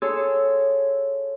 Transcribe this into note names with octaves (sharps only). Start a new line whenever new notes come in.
G#4 A4 C#5 C6 E6